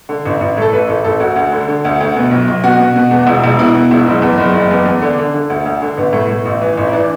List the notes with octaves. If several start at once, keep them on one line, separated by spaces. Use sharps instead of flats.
D3
A1
A1
A2 A4
A1 B4
A1 A4
A1 A4
D2 F#4
D2
D3
D3
D2
D2
B2
B1
B1
B2 F#4
B2
B2
E2
E1
E1
B2 E4
B2
E1
F#1
E2
F#1
F#1
E2
E2
D3 D4
D3
D3
D2
D2
D3
A1 B3
A2
A2
A1
E3
A1
E4
E3 D4